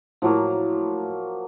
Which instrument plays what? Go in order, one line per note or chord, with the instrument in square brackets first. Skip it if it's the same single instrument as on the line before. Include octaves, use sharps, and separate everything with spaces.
[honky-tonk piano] A2 [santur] F3 F#3 A#3